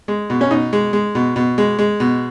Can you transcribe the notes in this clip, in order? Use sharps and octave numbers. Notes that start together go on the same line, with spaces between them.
G#3
B2
C#4
B2 D#4
G#3
G#3
B2
B2
G#3
G#3
B2